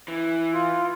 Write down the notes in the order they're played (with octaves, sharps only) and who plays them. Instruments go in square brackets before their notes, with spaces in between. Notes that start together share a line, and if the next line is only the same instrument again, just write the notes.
[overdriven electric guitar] E3
[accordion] F4